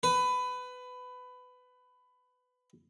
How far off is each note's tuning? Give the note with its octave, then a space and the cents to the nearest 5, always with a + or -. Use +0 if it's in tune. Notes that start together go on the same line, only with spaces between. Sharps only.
B4 +20